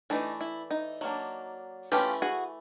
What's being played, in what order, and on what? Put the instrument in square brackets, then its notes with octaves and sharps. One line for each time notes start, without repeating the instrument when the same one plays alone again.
[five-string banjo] E3 A3 D4 D#4
E4
D#4
F#3 A#3 D4
E3 A3 C#4 F4 G4
F#4 G#4